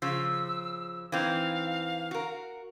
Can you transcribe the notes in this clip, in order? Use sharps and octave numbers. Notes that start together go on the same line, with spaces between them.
C#3 F3 E6
E3 C4 D#4 F5
F#4 A#4